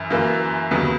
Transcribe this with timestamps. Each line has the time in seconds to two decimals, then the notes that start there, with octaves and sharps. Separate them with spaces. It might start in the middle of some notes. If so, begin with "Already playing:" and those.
Already playing: F#2 E3
0.10 F#2 E3 A#3
0.71 D#2 C#3 F#3 B3